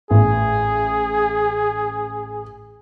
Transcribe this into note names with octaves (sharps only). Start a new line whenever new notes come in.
A1 G#4